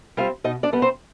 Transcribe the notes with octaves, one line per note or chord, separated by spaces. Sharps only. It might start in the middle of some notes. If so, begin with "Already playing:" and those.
G3 C4 F4 F5
B2 D#4 D#5
D4 D5
G3 B3
C4 C5